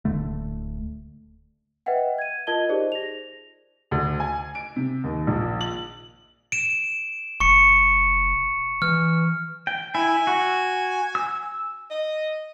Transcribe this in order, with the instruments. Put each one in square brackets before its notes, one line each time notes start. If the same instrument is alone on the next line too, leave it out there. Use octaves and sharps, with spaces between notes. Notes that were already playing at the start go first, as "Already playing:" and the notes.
[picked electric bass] D1 D3 A3
[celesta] B4 D#5 E5 F#5 G5
G#6 D#7
F4 A#4 D#5 A5 G#6 G7
D#4 G4 G#4 C5 D5 D#5
A#6 F7
[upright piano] D2
G#5
D7
C3
D#2
A#1
F#7
[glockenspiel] D7 E7
[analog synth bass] F1 [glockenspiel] C#6 C#7
[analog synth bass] E3 [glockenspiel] F6
[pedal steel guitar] G5
[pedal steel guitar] E4 [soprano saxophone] G#5
[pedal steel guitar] F#4
E6
[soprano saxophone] D#5